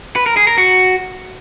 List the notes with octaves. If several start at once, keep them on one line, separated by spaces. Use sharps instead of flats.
B4
A#4
G#4
A#4
F#4